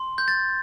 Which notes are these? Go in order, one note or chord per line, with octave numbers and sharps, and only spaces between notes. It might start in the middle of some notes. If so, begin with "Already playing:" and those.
Already playing: C6
G6
A6